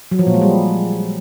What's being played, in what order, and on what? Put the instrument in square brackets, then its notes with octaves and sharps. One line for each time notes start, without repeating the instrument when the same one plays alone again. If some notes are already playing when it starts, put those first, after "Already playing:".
[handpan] F#3
F3
A#2
G#3
G3